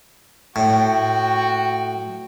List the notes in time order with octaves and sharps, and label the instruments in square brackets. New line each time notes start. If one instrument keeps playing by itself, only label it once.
[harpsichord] A2 [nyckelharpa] F#4 G5